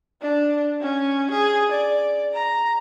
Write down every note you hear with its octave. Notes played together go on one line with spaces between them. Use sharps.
D4
C#4
G#4
D5
A#5